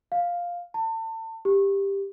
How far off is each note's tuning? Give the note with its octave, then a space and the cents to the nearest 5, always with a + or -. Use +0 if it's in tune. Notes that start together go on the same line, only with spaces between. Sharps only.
F5 +5
A5 +35
G4 +10